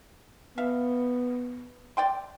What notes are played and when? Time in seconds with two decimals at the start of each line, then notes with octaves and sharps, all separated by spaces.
0.58 B3 E5 F5
1.97 D5 G5 C6